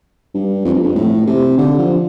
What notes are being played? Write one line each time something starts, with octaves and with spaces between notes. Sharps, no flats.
G2
F2
G2
F2
A2
C3
D3
F3